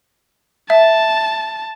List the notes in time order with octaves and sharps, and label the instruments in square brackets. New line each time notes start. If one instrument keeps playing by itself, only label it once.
[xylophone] E5 [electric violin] A5